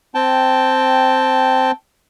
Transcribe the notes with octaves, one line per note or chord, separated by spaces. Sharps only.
C4 G5 A5